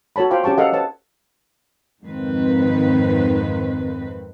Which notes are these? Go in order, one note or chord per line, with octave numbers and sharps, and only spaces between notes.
F#4 A4 C#5 A5 B5
F4 C5 F5 G5 B5 D6
C#4 G4 G5 A5 C#6
A4 C5 D#5 F5 F#5
B4 C#5 A5
F2 G#2 D#3 C4 B4